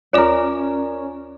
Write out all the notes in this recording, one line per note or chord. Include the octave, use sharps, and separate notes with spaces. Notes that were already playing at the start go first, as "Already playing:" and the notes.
D#2 C#4 F4 A#4 C#5 D5